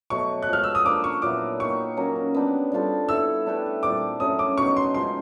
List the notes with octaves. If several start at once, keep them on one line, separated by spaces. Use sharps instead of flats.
B2 F#3 A3 C#6
F#6
F3 G#3 B3 F6
E6
D#6
F3 A#3 D4 F4 D6
C#6
A#2 F#3 B3 E4 D6
A#3 D#4 G4 C#6
F#3 A#3 C#4
B3 D4 G4
G3 C4 F4 A4
B3 E4 A4 C#5 E6
A3 D4 G4 B4
A#2 G3 C4 D6
F#3 A3 C#4 D#6
D6
B2 F#3 B3 D#4 C#6
C6
C#3 F3 G#3 C6